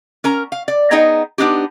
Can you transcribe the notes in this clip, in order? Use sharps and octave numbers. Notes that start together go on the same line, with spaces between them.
C#4 A#4 A#5
F5
D5
B3 D#4 G#4 D#5 G5 A#5
B3 D4 D#4 G4